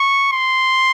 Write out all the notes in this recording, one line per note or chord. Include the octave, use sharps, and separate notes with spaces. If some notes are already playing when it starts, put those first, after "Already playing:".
Already playing: C#6
C6